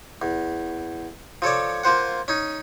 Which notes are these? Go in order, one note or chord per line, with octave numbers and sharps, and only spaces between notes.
E2
F3 A4 C#5 D5
A#3 F4 C5 F#5
C#4 D#4